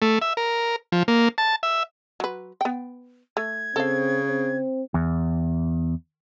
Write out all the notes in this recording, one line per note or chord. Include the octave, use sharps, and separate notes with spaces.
A3
E5
A#4
F3
A#3
A5
E5
F#3 B4
B3 G5
A3 G#6
C#3 C4 A4 F5
C4
E2